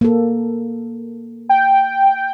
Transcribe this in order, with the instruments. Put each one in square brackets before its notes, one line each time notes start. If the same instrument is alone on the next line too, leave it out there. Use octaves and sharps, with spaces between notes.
[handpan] A#3 A4
[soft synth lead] G5